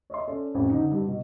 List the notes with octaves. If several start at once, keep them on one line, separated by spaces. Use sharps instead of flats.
C#5 D#5 E5 C6
C#4 A4 D5
A1 F2
D3 D#4
G2
B2